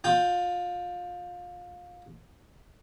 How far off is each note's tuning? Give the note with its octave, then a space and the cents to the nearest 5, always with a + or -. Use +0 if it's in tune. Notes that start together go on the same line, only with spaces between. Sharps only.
F4 +25 G5 +0